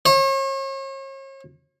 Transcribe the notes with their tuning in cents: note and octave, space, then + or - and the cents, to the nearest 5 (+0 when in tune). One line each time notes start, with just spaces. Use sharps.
C#5 -40